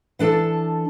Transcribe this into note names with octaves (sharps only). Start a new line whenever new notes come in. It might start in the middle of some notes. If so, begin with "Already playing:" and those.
E3 D4 A4 A5